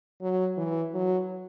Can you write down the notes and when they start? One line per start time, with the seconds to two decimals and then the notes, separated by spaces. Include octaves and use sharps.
0.21 F#3
0.57 E3
0.94 F#3